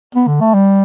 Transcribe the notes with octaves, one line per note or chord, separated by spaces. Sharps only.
B3
D3
A3
G3